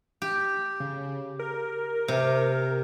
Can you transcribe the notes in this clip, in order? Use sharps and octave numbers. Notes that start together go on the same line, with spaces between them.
G4
C#3
A#4
C3